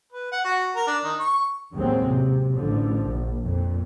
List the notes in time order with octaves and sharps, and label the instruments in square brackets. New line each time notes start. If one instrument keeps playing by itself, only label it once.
[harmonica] B4
F#5
F#4
A#4
D4
D#3
C#6
[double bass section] A1 D#2 D#3 F#3 G#3 C4
C3
A1 D3 F3
A#1
F2 A#2